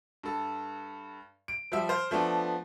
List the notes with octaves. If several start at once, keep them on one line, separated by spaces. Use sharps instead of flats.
G2 A4
D7
F3 G3 E5
C5 F6
F3 A3 B3 D4